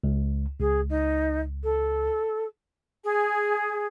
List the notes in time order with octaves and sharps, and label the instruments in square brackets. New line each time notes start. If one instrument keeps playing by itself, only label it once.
[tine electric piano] C#2
[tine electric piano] C#2 [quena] G#4
[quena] D#4
A4
[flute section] G#4